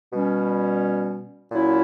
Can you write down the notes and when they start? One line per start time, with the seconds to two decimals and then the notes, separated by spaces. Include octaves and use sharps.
0.13 B2 G3 C#4
1.51 A#2 F#3 C#4 E4